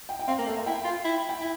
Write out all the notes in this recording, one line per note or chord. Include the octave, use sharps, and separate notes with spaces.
G5
G5
C4 F5
A#3
A3 E5
A#3
E4 G5
F4
E4
G5
E4